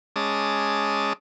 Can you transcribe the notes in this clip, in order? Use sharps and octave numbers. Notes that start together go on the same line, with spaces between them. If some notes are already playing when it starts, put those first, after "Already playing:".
G#3 C#4 A5 D6 D#6